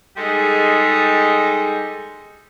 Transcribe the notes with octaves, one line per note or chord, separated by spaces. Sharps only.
G3 G#3 D#4 G#4 A4